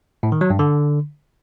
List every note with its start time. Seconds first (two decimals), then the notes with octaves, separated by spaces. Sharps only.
0.23 A2
0.32 D#3
0.41 F#3
0.50 G2
0.59 D3